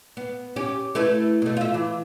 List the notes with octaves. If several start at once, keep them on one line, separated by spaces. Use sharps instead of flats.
B3
C#4 G4
A3 E4 B4
B2 A3
F4 E5
E3